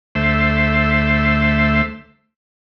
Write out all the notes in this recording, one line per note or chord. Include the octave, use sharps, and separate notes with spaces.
D2 A3 C5 E5